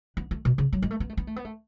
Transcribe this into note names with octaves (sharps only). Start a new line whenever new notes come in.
B3
A3
B2
C#3
F#3
G#3
A3
B3
A3
B3
A3
B3
A3